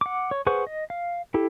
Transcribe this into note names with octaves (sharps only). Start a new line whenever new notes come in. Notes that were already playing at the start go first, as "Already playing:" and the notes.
F#5 D6
C#5
G#4 B4 C5 F#5 C#6
D#5
F5
E4 G4 A4